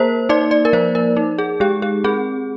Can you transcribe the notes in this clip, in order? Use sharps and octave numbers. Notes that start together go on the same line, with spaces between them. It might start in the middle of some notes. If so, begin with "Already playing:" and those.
Already playing: A#3 A#4 C5
D#4 D5
D5
A#4
F3 C5
A#4
D#4
G#4
G#3 G4
G4
C4 G#4